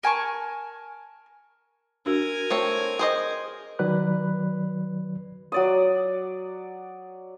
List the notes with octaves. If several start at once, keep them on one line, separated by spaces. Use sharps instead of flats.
A#4 G#5 A5 C#6
D4 F#4 A#4 G#5
A3 C4 C#5
G#4 C5 D#5
D#3 F#3 B4 D5 B5 F#6
F#3 D5 D#6